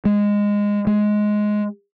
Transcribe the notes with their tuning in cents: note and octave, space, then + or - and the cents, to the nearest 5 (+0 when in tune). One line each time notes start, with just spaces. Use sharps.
G#3 -15
G#3 +10